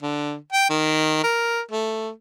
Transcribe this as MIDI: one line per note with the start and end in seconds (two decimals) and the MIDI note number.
0.03 0.34 50
0.53 0.68 79
0.70 1.20 51
1.24 1.61 70
1.72 2.09 57